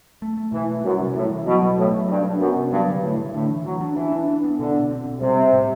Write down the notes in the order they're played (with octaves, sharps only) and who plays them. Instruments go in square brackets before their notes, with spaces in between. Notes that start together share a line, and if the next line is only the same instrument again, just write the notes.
[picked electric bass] A3
A3
[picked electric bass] B2 [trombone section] E3
[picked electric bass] A3
[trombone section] F#2 [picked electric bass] G3
[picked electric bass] C3
[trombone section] A2 [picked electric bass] G3
[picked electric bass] E3
[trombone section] B2 [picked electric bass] F#3
[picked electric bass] B2
[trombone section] A2 [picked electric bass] A3
[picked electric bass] F#3
[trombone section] G2 [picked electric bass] D4
[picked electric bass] D4
[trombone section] F#2 [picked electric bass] B3
[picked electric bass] C3
[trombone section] G2 [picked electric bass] F#3
[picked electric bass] D3
[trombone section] A2 [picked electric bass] D3
[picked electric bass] D3
[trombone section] A2 [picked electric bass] D4
[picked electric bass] E3
[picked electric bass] E3 [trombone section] F#3
[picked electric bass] D4
[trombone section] E3 [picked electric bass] D4
[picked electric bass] D4
D4
B3
[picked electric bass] B2 [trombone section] D3
[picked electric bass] B2
C4
B2
[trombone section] C3 [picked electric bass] G3
[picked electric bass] C4
A2